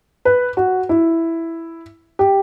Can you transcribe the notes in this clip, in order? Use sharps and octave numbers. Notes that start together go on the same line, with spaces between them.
B4
F#4
E4
G4